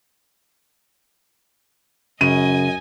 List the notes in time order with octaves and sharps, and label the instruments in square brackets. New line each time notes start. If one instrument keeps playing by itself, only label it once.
[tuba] F#2 [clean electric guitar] C#3 [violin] D#5 G#5 [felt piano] D#7